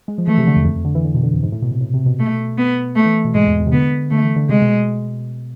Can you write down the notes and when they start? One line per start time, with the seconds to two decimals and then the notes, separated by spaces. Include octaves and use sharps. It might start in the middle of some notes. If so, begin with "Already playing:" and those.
0.08 G#3
0.18 F3
0.27 E3 A3
0.38 C3
0.47 D3
0.56 E2
0.65 F2
0.76 F2
0.85 D3
0.95 E3
1.05 D3
1.14 B2
1.23 D3
1.33 F2
1.43 G#2
1.52 A2
1.62 B2
1.71 C3
1.81 A2
1.94 C3
2.06 B2
2.19 A3
2.58 B3
2.96 A3
3.05 E3
3.25 B2
3.34 G#2 G#3
3.47 E2
3.60 E2
3.67 C3
3.72 D3 B3
4.11 D3 A3
4.23 E3
4.36 D3
4.49 C3 G#3
4.62 B2